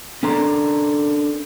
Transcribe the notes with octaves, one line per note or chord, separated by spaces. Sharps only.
C#4 D4 A4 A#4 A#5 C6